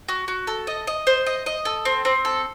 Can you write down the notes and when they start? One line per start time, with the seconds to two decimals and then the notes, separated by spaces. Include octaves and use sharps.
0.09 F#4
0.28 F#4
0.47 A4
0.67 D#5
0.87 D#5
1.07 C5
1.26 D#5
1.46 D#5
1.65 A4
1.85 C4
2.05 C4
2.25 A4